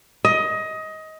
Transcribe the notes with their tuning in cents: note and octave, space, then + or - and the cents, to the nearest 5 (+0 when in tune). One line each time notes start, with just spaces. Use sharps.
D#5 +20